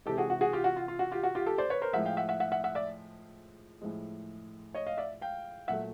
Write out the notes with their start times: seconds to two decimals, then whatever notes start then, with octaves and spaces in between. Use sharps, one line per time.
0.06 C3 E3 G#3 G4 A4
0.18 F#4 G#4
0.30 F#4
0.41 F#4 G#4
0.53 F4 G4
0.64 F#4
0.76 F4
0.88 F4
0.99 F#4
1.12 F4 G4
1.23 F#4
1.35 F4 G4
1.46 G4 A4
1.58 C5 D5
1.70 B4 C#5
1.82 A#4 C5
1.93 A2 F3 G#3 E5 F#5
2.06 F5 G5
2.17 E5 F#5
2.29 E5 F#5
2.40 E5 F#5
2.52 E5 F#5
2.64 E5 F#5
2.75 D5 E5
3.82 A2 F3 G#3
4.74 C#5 D#5
4.86 D#5 F5
4.98 D5 E5
5.21 F5 G5
5.68 A#2 F#3 A3 E5 F#5